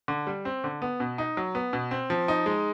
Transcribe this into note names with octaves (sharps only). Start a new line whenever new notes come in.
D3
G3
C4
D3
B3
B2
D#4
F#3
B3
B2
C4
F3
D#4
G#3